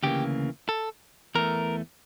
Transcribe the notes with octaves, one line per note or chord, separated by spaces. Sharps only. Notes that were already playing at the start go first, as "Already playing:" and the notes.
D2 C#3 E3 A#3 G4
A4
E2 E3 A3 A#4